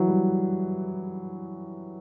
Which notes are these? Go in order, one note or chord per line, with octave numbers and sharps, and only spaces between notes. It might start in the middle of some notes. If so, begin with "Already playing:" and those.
Already playing: E3 F#3
G3